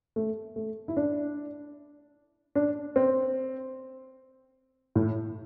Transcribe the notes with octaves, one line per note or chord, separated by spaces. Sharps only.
A3
A3
E4
D4
D4
C4
A2